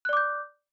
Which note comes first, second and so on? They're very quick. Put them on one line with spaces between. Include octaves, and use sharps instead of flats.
F#6 D5 D6 G6